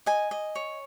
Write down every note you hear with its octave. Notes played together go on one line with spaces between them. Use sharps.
D#5 G#5
D#5
C#5